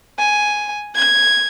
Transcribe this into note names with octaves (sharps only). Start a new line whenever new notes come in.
G#5
G#6